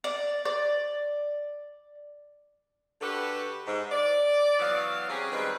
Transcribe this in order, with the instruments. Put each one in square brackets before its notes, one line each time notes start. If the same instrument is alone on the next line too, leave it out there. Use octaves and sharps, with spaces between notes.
[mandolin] D5
D5
[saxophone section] D3 F#4 G4 A4 B4
G#2
D5
E3 F#3 B3 C#5 D5 F5
F#3 C4 C#4 G4 G#4
D#3 G3 G#3 C4 B4